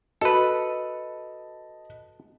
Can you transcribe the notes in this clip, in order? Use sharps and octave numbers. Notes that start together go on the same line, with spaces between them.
F#4 A4 B4 D#5 A5